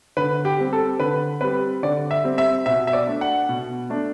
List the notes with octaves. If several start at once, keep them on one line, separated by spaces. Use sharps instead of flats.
D3 B4
G4
G3 C4
A4
D3 B4
G3 C4 B4
D3 D5
E5
G3 C4
E5
B2 E5
E5
D5
A3 D4
F#5
B2
A3 D4